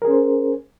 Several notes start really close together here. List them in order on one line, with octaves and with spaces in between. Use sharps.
A#4 G#4 C#4 C5